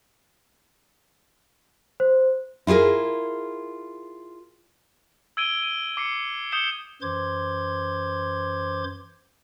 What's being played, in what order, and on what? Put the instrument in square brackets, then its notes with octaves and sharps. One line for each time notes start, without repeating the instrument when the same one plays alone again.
[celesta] C5
[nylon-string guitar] E4 F4 G4 G#4 A#4
[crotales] E6 G#6 D7 D#7 G7
D#7
D6 C7 C#7
D#6 G6 C7 C#7 E7 G7
[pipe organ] F#2 E3 C5 C6 D6 G#6